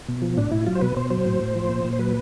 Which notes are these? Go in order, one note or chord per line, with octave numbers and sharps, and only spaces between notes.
B2
F3
A2 D4
A2 E4
F#3 F4
C5
B2 B4
B2 C5
F#3 C5
A2
A2
F3
A#2
A#2
C5
F#3 B4